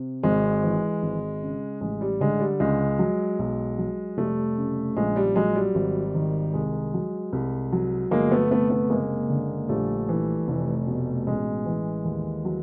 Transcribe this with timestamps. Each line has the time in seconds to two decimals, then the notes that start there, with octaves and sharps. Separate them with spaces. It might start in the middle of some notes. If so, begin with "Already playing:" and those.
Already playing: C3
0.23 G#1 G#3
0.63 E3
1.03 G#1
1.42 C#3
1.81 A1 G#3
2.01 G3
2.21 D3 G#3
2.40 G3
2.60 C#2 G#3
2.99 F#3
3.39 B1
3.78 F#3
4.17 F1 G3 A3
4.57 C#3
4.96 A#1 G#3
5.16 G3
5.36 F#3 G#3
5.55 G3
5.75 G#1
6.15 D#3
6.54 C2 G#3
6.94 F#3
7.33 C2
7.73 F#3
8.11 G1 G#3 A#3
8.31 A3 B3
8.51 C3 A3 B3
8.70 A3 B3
8.90 F#1 G#3 A#3
9.30 D3
9.69 A#1 G3 A3
10.09 E3
10.48 F1
10.87 B2
11.27 A1 G#3
11.66 E3
12.05 D#2
12.45 F#3